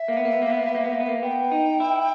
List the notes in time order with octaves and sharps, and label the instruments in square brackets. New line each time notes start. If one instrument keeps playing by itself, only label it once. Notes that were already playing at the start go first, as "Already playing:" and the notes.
Already playing: [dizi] E5
[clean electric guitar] A#3
B3
A#3
B3
A#3
B3
A#3
B3
A#3
B3
A#3
B3
A#3
[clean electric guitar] B3 [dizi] G5
[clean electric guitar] D#4
E4